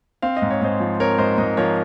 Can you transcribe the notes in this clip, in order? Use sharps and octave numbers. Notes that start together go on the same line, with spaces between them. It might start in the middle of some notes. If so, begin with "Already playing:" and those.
C4 F5
D#5
G#2
C#5
G#2 C5 D#5
F3
C4 A#4 C#5
G#2 C5 D#5
G#2 C5 D#5
F3 A#4 C#5